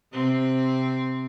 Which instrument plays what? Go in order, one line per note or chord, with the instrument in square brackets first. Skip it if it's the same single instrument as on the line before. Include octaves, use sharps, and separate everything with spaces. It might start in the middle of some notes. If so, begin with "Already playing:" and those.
[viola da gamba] C3 C4